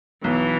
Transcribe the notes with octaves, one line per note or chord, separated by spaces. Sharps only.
B1 E3